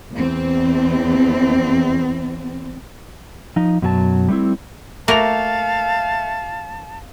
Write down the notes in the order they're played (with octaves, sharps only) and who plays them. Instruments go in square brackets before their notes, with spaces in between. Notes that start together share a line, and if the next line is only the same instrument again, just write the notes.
[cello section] E2 C4
[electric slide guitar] F3 D#4
F#2 B2 F#3 G4 A5
G3 A3 B3 C4 E4
[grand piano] A3 F7 [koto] A#3 F#4 A#4 [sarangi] F5 [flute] A5